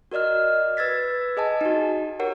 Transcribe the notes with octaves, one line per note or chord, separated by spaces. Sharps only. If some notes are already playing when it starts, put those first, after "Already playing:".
F#4 A#4 D5 D#5 F6
B4 E6 G#6 A6 B6
G#4 D#5 G#5 A5
D#4 F#4
G4 A#4 C#5 F#5